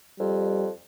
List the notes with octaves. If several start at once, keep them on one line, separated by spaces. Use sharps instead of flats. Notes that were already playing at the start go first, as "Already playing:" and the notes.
F2 G3